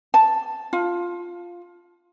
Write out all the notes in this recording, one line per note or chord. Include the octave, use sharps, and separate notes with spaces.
A5
F4